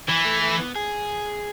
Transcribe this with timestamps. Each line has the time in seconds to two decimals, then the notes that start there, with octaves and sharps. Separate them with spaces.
0.08 E3 E4
0.25 A3
0.43 A3
0.59 B3
0.76 G#4